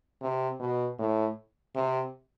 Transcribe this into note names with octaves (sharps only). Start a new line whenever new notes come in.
C3
B2
A2
C3